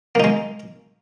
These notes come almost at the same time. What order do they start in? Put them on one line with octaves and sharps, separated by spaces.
A#3 D#4 G#3